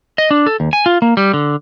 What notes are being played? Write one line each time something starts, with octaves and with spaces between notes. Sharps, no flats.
D#5
D4
A4
D#2
G#5
F4
A#3
G3
D3